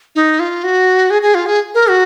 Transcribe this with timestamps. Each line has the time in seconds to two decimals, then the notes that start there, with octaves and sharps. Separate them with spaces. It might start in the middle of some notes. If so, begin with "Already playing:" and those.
0.15 D#4
0.40 F4
0.64 F#4
1.10 G#4
1.22 G#4
1.35 F4
1.46 G#4
1.75 A#4
1.89 F#4